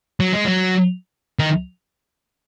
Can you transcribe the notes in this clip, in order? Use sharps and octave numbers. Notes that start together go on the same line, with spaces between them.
F#3
G#3
F#3
D#3